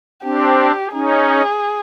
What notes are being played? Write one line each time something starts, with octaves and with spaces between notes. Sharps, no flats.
C4 D4 G4
C#4 D#4 G#4